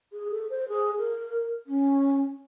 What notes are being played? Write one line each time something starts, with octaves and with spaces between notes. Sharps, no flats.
G#4
A4
C5
G#4
A#4
C#4